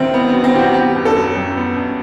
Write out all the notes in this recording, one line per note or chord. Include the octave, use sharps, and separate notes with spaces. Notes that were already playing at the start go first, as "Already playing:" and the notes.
Already playing: D#2 D#3 F#3 C4 E4
B3
F#3 B3
C4
D#2 G4
F#4
B3 G4
F#2
A4
F#3
F#2
B3
F#2